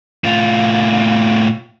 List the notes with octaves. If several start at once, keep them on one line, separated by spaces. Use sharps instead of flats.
A2 F4